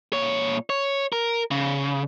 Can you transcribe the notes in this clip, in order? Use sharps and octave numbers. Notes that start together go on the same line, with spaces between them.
A#2 C#5
C#5
A#4
C#3